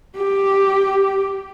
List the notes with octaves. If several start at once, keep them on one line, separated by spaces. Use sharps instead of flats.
G4